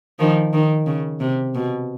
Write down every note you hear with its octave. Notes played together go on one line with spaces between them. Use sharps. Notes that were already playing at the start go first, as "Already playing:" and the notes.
D#3 F3
D#3
C#3
C3
B2